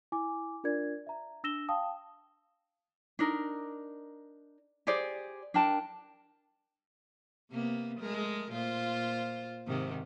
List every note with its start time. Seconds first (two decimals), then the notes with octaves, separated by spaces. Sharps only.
0.12 E4 G#5 D6
0.64 D4 F4 A#4 D5 G#6
1.07 E5 A#5
1.44 D4 E6 A#6 E7 G7
1.69 F5 G5 A5 D#6
3.19 D4 D#4 A#4
4.87 G4 G#4 C5 D5
5.54 D4 A#4 G5 A5
7.51 C3 A#3 B3
8.00 G#3 A3 A#4
8.52 A#2 F4 C5
9.67 G#2 C3 D#3